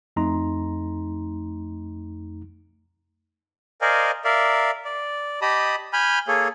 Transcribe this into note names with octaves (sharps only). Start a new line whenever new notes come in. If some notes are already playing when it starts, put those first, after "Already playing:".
F2 A3 D#4 A#5 C6
A#4 C5 D5 D#5 F5 G#5
A#4 D5 E5 F5
D5
G4 D#5 A5 B5 D#6
G#5 B5 F6 G6
A#3 G#4 A4 C#5